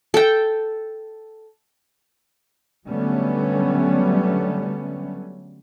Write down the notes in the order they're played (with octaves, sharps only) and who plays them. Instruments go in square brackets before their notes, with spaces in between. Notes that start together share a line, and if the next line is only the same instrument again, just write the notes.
[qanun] A4 G5
[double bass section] D3 F#3 G3 A3 B3 C#4